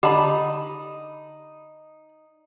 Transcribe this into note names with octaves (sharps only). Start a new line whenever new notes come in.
D3 D#4 G4 A5 B5